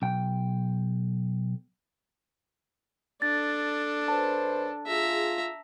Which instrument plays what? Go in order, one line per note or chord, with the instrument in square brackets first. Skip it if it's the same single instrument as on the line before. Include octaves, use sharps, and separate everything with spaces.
[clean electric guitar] B1 G5
[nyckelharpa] D4 A4 [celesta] A6
[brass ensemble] F#2 B4 C5 [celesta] A5
[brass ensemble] F4 G#4 [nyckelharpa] E5 A#5